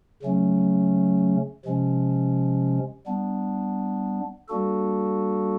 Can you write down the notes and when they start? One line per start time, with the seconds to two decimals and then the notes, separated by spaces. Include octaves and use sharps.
0.23 C#3 F#3 A3 C#4
1.65 C3 F3 G#3 C#4
3.07 G3 B3 D4
4.49 G3 A#3 D4 F#4 A4